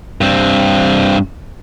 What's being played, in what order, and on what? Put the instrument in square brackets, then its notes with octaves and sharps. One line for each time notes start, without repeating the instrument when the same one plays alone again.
[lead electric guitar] G2 C4